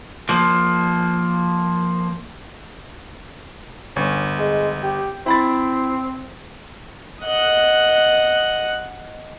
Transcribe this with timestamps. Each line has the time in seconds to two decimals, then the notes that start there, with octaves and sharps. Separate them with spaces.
0.29 F3 A#3
3.96 G1 C#4
4.38 G#3
4.83 G4
5.26 C4 E4 B5 A6
7.23 D#5 F#5